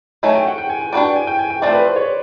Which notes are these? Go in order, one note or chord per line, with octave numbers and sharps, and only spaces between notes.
D#3 F#3 A3 C#4 G#5
G5
F#5
G5
G#5
G#5
D4 F#4 B4 D5 G5
G5
G#5
G5
G#5
G5
F3 A3 C4 F4 D5
B4
C5
C#5